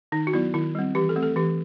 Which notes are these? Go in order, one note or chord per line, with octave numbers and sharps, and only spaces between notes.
D#3 D#4
F#4
F#3 B3 E4
D#3 E4
G3 C4
E3 G4
A4
A3 C4
A4
E3 G4